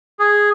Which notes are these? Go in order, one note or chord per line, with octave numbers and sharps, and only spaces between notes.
G#4